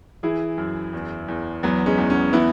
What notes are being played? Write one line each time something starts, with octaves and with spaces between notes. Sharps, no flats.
E3 E4 G#4
F#2
E2
E2
E2 F#3 B3
G#3 C#4
E2
G#3 C#4
E3 B3 E4